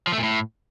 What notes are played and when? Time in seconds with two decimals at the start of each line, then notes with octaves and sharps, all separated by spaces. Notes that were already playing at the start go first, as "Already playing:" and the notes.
0.07 F3
0.13 A3
0.18 A#2
0.23 A2